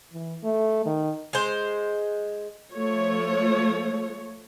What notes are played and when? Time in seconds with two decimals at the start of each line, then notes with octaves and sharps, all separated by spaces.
0.12 E3
0.44 A3
0.86 D#3
1.33 G#3 C5
2.73 F3 A3 C#5